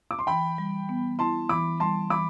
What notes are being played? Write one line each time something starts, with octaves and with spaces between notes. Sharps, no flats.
D6
C6
E3 G5 B5
G3
B3
E4 A5 C6
E3 B5 D6
G3 A5 C6
E3 B5 D6